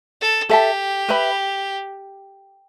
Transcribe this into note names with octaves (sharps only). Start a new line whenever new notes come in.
A4
G4 A4 E5 A5
B4 E5 B5